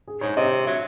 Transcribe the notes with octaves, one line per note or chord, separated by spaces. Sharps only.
G#4
G#2 C#5
C3 D#5
F#3 E5